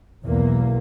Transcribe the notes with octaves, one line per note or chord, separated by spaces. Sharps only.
B1 E2 A#3